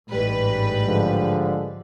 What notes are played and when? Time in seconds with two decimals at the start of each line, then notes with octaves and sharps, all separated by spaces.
0.12 A1 G#2 G3 B4
0.87 D3 F3 G#3